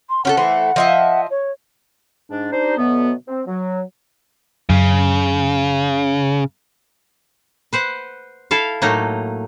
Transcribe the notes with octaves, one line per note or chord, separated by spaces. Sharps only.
C6
C#4 G4 A4 F#5
E3 A3 C5
F3 D#5 E5
C#5
G#2 D4
G3 D4 D#4 C5
B2 D3 F#3 A3 B3
C4
F#3
F#2 C#3
B4 C5 F#5
E4 A4 F5
A2 F#3 A3 A#3 D#4